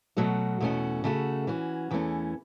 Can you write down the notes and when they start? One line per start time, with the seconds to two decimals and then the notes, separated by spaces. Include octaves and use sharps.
0.17 B2 F#3 A3 F#4
0.60 E2 B2 A3 C#4 F#4
1.04 C#3 A3 F#4
1.47 E3 C#4 F#4
1.91 E2 E3 A3 C#4